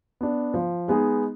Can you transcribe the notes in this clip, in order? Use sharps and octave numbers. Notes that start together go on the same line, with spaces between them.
B3 D4
F3
G#3 B3 D#4 G#4